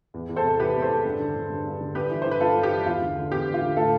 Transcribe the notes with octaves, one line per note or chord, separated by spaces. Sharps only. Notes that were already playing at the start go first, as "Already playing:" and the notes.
E2
E2
A4 C5
C3
E3 G4 B4
E2
A4 C5
E2
G2
D3
D3
G2
G2
D3
G2 G4 B4
E3
E3 C5
B4
G2 F4 A4
G2
G4
E3
E2 F4
D3
D3
E2 G4
E2
F4
D3
A2 F4 A4